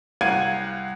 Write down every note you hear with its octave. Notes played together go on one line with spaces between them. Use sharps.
C2 F5 F#5 G#6 D#7